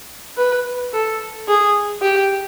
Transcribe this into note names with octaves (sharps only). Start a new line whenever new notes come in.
B4
A4
G#4
G4